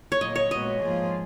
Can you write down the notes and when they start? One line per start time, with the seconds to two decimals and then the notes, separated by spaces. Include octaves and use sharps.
0.12 C#5
0.20 A#2 F#3 A#3 D#5
0.36 C#5
0.51 A#2 G#3 B3 F#4 D#5
0.81 G#2 F3 A#3 F4 G#4